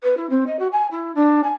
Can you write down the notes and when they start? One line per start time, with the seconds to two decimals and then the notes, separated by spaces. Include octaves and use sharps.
0.03 B4
0.17 E4
0.30 C4
0.47 D#5
0.59 F#4
0.72 G#5
0.91 E4
1.15 D4
1.44 G#5